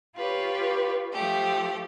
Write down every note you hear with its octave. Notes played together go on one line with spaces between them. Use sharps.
F4 G4 B4 C#5
F3 A3 G4